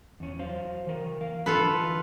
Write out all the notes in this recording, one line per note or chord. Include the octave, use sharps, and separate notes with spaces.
E2 C#4
F#3 C5 F5
E3 A#4
A#4 F5
D3 E3 F4 A4 B4